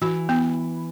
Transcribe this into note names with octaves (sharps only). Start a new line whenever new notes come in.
E3 F#4
B3